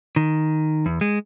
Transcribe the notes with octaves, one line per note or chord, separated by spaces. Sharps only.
D#3
E2
G#3